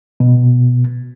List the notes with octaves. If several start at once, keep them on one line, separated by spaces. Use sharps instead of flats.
B2